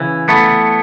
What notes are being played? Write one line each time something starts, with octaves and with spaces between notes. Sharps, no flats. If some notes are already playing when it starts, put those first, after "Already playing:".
Already playing: C#3 E3
A3 B3